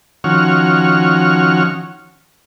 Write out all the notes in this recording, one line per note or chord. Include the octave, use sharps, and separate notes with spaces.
D#3 F3 C#4 F#4 C#6 F6